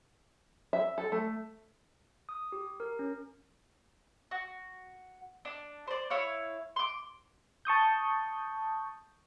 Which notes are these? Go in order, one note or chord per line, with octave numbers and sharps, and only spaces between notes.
E5
A4
A3
D#6
G4
A#4
C#4
F#4
D4
C5 D5
E4 C#5 F5
C6 D6
A5 C#6 D#6 G6